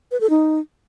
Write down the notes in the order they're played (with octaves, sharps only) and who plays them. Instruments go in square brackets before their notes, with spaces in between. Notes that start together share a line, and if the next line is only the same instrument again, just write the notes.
[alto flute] B4
A4
D#4